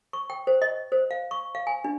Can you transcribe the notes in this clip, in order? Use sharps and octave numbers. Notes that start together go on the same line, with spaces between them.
C#6
G5
C5
D#5
C5
F5
C#6
F5
G#5
D4